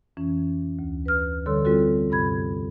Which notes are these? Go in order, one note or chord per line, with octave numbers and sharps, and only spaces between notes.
F2 E3 C#4
D2
B4 F6
D3 G3 A4 C#5 C6 E6
G3 C4 F4 F#4 A4
G2 C3 B5 G#6